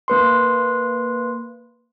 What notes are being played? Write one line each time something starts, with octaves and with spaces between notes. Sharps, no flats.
A#3 B4 C6